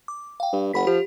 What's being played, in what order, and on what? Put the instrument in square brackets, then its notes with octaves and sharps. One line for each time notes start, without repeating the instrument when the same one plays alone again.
[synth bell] D6
F5 G5
[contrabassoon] G2
[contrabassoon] F#1 [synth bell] F#5 B5 B6
[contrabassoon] F3 [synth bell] G4